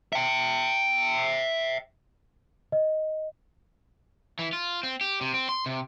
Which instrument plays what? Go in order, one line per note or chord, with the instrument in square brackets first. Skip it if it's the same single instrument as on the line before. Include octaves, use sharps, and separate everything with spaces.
[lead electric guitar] E5 G5
[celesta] D#5
[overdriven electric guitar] E3
F4
C4
G4
C3
C4
C6
C3